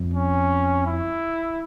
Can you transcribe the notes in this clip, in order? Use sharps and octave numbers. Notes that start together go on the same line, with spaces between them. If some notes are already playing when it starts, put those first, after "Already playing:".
Already playing: F2
C#4
E4